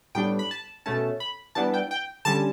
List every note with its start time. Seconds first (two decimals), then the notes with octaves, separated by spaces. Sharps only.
0.15 A2 G3 B3 D4 G5
0.39 B5
0.51 A5
0.86 B2 A3 C#4 A5
1.20 B5
1.55 E3 G3 B3 D4 A5
1.74 G5
1.91 G5
2.25 D3 G3 C#4 A5